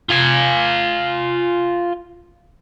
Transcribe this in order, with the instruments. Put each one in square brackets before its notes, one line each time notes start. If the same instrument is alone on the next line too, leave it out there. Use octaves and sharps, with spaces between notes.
[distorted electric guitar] F4 G#5